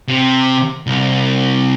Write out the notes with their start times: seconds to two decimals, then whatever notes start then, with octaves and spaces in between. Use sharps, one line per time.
0.08 C3
0.87 C2